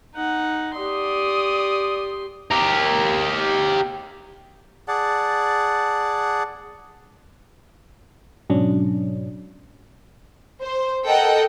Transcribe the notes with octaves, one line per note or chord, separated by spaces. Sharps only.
D#4 F#5
G4 D5 C6 D#6
G4 A#4
G#4 D5 F#5 A5
G#2 B2 F#3 C#4 D4
C5
A4 A#4 D#5 F#5 G5